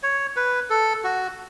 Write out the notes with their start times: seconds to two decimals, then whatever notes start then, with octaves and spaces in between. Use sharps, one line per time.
0.03 C#5
0.36 B4
0.70 A4
1.04 F#4